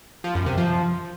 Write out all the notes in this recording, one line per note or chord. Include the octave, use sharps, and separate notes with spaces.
F3
F#2
C3
F3